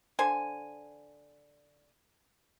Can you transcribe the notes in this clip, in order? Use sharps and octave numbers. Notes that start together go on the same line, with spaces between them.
D3 C5 G#5